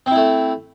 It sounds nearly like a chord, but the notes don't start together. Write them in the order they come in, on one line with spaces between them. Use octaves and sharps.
C4 E4 A3